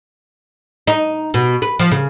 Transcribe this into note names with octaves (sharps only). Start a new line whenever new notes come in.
D#4
B2
B4
F3
C#3